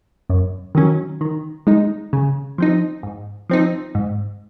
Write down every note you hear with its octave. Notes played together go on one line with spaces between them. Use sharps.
F#2
D#3 F#3 C#4
D#3
G#3 D#4
C#3
F3 C4 D#4
G#2
F3 C4 D#4
G#2